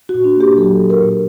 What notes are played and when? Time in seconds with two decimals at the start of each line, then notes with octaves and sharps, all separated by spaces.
0.09 A#2 F#4
0.24 D4
0.35 A#3
0.41 G4
0.57 F#3 A4
0.79 F#3
0.90 A#4
1.01 A#2